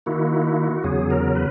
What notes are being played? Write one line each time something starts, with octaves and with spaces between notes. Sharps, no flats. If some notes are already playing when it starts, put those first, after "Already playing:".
D#3 A#3 E4 F#4
E2 C#3 F#3 G#4
A#4
B4